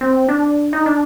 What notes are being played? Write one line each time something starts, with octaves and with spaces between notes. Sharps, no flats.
C4
D4
D#4
D4